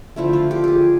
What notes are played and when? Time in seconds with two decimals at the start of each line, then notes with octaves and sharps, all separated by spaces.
0.16 D3 F3 A3 E4
0.33 F4
0.51 G4
0.64 G4 G#4